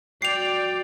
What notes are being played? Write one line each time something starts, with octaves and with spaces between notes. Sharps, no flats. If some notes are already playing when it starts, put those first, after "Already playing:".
F#4 D5 G5 C7 F7